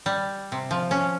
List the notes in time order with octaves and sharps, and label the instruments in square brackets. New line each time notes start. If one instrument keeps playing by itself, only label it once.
[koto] G3
C3
F3
C#4